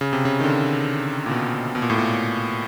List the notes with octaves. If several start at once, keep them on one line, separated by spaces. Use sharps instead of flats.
C#3
C3
C#3
D#3
D3
A#2
B2
B2
A#2
A2
A#2